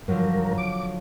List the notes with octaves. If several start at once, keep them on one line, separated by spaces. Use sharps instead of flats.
G2 D3 F3 F#3 A#4
D6